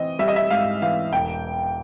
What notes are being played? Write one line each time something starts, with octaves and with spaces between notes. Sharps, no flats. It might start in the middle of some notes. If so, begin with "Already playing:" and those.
Already playing: E3 C4 D#5
G3 E5
D#5
E5
G#2 F5
E3 F5
E1 G5